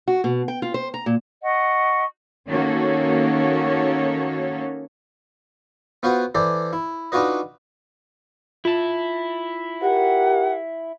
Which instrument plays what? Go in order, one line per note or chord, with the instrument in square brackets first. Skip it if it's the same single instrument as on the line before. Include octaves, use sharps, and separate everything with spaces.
[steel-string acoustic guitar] F#4
B2
G5
F4
C5
A#5
A#2
[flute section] D#5 F#5 C#6
[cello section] D#3 A#3 C#4 F#4 A4 C#5
[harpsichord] B3 F4 F#4 C5 F#5
E3 G4 A4 C5 D5
E4
D4 D#4 F4 F#4 B4 D#5
[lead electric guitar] E4 A5 [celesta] F4
[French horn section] G4 A#4 [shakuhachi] F#5